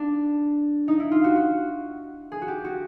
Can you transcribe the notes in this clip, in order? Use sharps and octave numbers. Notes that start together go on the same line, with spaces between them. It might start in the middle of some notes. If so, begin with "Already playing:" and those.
Already playing: D4
D#4
E4
F4
F#4
F#4
G#4
F#4
G4
F#4